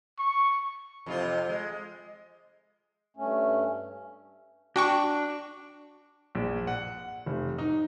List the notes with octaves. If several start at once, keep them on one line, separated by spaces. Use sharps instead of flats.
C#6
F2 C3 F4
G#3
G2 A3 C#4
D4 F#4 G5 C#6
A#1
F#5
F1
D#4